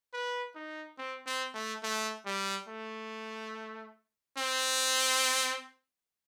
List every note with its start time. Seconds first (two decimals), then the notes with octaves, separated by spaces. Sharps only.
0.13 B4
0.55 D#4
0.98 C4
1.26 C4
1.54 A3
1.83 A3
2.26 G3
2.68 A3
4.38 C4